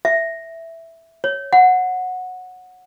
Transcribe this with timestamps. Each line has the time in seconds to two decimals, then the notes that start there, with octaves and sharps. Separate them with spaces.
0.05 E5
1.24 C#5
1.53 F#5